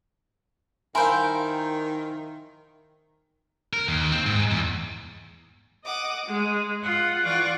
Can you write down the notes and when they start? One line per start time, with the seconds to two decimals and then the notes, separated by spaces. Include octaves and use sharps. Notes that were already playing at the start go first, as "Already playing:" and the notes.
0.95 D#3 E4 A#4 C5 F5 G5 G#5 C6
3.73 A#4
3.87 D#2
4.12 C4
4.26 G#2
4.51 E2
5.84 D#5 F#5 D6
6.25 G#3
6.83 F4 F#5
7.23 E3 F4 D5 F#5 C#6 D6